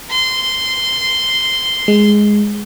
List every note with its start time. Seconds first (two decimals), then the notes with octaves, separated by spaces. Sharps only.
0.10 C6
1.88 G#3